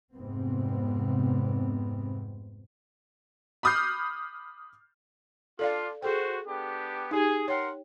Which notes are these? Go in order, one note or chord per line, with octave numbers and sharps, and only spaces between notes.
F1 G#2 C3 B3 C4
B5 D6 D#6 F6 G6 C7
D4 F4 A4 D5 F5
F#4 G#4 A4 C5 G5
B3 D4 G4
D#4 G4 G#4
A#4 C#5 F#5 G5 C6